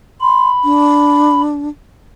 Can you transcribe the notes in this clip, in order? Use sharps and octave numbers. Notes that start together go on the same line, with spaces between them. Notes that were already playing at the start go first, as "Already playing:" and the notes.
B5 C6
D4